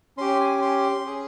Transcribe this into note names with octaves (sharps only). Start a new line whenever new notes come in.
C#4 G4 C6
G#5
C6
C#4 G#4